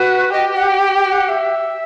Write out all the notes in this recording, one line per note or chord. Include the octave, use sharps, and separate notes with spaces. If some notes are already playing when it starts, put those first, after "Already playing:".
Already playing: F#4 B4
G4 D#5
F#5
G5
G5
G5
F#5
E5